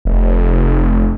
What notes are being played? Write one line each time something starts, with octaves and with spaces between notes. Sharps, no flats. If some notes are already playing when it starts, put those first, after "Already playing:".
F1